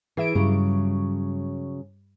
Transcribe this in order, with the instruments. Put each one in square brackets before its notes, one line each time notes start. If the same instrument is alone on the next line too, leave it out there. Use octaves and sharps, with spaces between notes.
[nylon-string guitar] E3 [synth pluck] G#4 E5 D7
[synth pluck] G2 G3 [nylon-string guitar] C#3 F#3